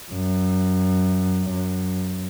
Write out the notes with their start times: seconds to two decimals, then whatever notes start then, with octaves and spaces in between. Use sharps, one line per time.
0.11 F#2
1.50 F#2